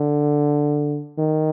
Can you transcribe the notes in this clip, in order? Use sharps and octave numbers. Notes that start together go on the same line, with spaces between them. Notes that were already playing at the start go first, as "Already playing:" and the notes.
Already playing: D3
D#3